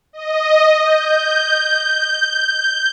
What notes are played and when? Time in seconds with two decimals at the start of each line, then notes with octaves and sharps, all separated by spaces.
0.13 D#5
0.82 G6